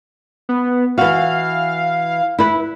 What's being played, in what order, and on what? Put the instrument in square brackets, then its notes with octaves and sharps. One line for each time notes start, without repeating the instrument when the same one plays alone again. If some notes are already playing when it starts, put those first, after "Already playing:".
[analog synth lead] B3
[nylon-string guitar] E3 F#4 [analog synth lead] F5
[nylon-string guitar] E4 B4